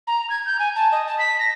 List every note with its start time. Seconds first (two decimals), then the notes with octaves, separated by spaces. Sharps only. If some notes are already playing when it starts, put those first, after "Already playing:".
0.07 A#5
0.29 G#6
0.45 G6
0.58 G#5
0.75 A5
0.91 D#5
1.07 A5
1.18 B6
1.39 A#6